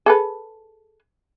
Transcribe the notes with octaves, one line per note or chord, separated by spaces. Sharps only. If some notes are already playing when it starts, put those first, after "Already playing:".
G#4 A4 B4